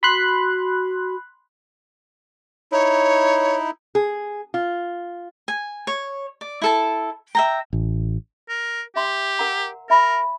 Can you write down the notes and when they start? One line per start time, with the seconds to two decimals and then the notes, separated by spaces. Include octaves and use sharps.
0.03 F#4 B5 C6 F#6
2.72 D#4 E4 C#5
3.95 G#4
4.54 F4
5.48 G#5
5.87 C#5
6.41 D5
6.62 E4 A4 A5
7.35 E5 G5 A#5
7.73 A1
8.49 A#4
8.96 G4 E5 C6
9.39 A#4 F#5 A#5
9.90 A#4 E5 A5 B5